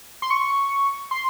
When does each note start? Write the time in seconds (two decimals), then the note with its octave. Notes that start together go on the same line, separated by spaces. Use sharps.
0.22 C6
0.30 C#6
1.11 C6